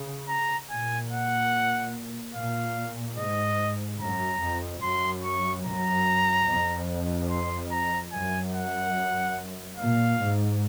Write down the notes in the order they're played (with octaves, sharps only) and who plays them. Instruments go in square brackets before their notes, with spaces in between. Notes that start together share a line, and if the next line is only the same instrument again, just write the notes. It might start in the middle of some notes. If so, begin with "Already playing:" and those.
Already playing: [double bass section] C#3
[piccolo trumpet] A#5
[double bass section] A#2 [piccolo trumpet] G#5
[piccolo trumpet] F#5
[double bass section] A#2 [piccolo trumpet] F5
[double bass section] G#2 [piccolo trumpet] D#5
[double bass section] F#2 [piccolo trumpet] A#5
[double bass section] F2
[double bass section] F#2 [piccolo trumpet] C6
[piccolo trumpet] C#6
[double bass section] F#2 [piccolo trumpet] A#5
[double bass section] F2
[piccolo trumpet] C6
A#5
[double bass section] F#2 [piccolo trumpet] G#5
[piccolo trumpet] F#5
[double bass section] A#2 [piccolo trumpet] F5
[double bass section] G#2